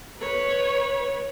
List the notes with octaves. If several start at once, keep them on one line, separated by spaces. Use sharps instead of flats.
B4 C#5